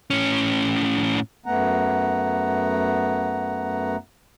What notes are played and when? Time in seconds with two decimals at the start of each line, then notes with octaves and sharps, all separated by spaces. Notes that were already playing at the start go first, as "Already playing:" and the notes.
0.10 A2 C#4
1.46 F#2 A3 B3 F#5 A#5